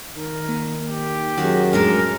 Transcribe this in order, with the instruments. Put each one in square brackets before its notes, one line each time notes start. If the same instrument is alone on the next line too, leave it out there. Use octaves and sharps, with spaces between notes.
[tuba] D#3 [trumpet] A#4
[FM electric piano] A#3
[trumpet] G4
[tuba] F#2 [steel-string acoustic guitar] D#3 F#4 G#4
[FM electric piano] F2 A2 [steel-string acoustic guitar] G#3 D4 A4 [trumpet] A#4